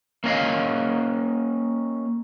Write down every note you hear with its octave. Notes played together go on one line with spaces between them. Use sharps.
A#3 C#4 D#5 F5